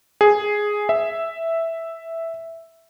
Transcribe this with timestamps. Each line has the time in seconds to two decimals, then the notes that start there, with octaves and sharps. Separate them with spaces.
0.21 G#4
0.89 E5